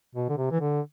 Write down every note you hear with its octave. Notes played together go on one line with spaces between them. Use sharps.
B2
D3
C3
E3
D3